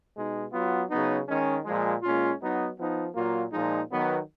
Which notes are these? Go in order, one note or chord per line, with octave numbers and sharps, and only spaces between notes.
B2 G#3 D#4
F#3 B3 F4
C#3 F#3 B3 D#4
D#3 G#3 C#4
A#2 F3 G#3
A#2 G#3 C#4 F4
F#3 B3 D#4
F3 B3 D#4
A#2 F#3 A#3 F4
A#2 F3 G#3 D#4
D#3 F#3 B3